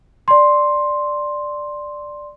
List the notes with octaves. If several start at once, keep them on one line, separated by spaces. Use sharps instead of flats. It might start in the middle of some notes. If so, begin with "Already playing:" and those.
D5 C6